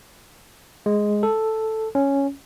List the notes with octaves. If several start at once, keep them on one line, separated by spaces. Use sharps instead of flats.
G#3
A4
C#4